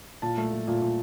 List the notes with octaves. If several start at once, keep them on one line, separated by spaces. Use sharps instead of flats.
A#2 A5
A3
A3
A#2
A#2